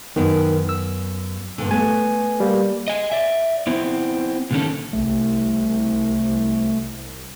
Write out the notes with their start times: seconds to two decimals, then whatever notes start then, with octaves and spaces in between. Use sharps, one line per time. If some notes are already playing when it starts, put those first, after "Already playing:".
0.16 F#2 D#3 B3
0.69 E6
1.58 G2 A#2 D3
1.71 A3 B3 G#5
2.40 G3 A#3
2.88 D#5 G#5
3.12 D5 E5
3.67 B3 C4 E4
4.51 A#2 D3 D#3 G#3 C#4 A4
4.93 C2 A3